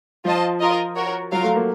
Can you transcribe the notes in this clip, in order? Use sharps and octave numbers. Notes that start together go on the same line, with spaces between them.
F3 F4 C5 D#5 A5
F4 A#4 D#5
F#4 A#4 C#5
F#3 F4 A#4 F5
A3
A#3